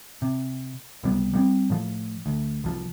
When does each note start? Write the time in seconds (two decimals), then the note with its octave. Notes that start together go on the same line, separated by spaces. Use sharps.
0.22 C3
1.03 C#2 C3 G3 B3
1.33 G3 B3 C4
1.70 A2 F3
2.26 D2
2.64 C2 F3